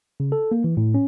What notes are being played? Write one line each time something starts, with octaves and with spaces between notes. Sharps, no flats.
C#3
A4
A#3
E3
A2
C#4